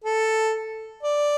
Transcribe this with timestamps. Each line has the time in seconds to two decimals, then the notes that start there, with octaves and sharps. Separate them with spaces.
0.04 A4
1.03 D5